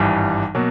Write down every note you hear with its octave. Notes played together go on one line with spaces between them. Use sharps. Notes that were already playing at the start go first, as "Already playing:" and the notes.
Already playing: G#1 G2 E3 G3
B2 F#3 A#3